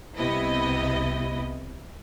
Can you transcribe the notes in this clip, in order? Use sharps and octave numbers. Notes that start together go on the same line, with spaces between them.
C2 C3 B3 E4 D#5